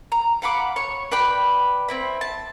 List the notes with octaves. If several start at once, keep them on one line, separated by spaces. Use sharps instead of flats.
A#5
F5 F#5 B5 D6
C#5 C#6
B4 D5 G5 B5
C4 E4 B5
A5